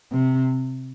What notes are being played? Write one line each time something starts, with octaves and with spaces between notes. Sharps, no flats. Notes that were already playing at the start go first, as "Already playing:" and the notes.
C3